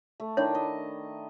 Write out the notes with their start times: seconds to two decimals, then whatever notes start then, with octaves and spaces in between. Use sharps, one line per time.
0.20 A3
0.37 D#3 D4 E4 C#5
0.55 D#5